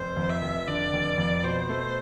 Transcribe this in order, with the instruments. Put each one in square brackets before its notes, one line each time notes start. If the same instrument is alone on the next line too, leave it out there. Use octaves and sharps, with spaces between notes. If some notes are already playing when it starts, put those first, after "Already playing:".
Already playing: [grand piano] F1 [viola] C5
[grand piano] F2
[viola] E5
[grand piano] F1
[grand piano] D3 [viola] D5
[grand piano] F1
F2
[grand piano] B2 [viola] C5
[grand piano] A3